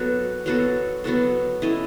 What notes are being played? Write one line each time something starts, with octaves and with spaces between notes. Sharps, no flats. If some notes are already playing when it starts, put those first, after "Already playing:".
Already playing: F#3 B3 F#4 A4
F#3 B3 F#4 A4
F#3 B3 F#4 A4
C#4 E4 A4 D#5